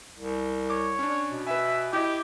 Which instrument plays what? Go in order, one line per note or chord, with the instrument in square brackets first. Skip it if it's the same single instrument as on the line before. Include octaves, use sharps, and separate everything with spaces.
[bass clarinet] C2
[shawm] C#5 [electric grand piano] D6
[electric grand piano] C#4 D4
[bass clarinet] B2
[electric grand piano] B4 G#5 [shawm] E5
[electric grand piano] E4 D#5 [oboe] G4 [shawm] G5